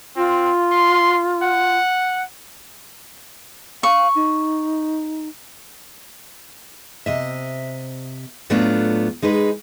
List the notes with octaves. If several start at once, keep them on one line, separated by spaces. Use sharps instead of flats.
C4 F4
C6
F#5
F5 C#6
D#4
C3 D#5 E5
A2 F#3 A3 B3 D4 F4
G#3 D#4 G#4 B4